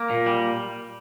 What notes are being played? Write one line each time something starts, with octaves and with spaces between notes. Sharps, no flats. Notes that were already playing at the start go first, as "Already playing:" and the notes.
Already playing: A#3
A#2
G3